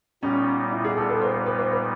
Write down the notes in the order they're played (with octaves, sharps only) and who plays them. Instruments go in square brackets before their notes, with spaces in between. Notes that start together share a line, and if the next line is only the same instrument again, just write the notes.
[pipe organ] A#2 G3 B3 D#4 [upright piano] C#4
[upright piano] E4
G#4
A4
B4
C5
C5
B4
C5
B4